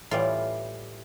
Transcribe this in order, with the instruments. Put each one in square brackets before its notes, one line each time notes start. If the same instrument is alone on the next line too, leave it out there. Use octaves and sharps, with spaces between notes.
[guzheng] A2 E3 G3 F4